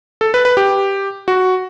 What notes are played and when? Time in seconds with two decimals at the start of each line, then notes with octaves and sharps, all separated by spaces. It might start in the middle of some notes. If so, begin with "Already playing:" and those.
0.21 A4
0.34 B4
0.45 B4
0.57 G4
1.28 F#4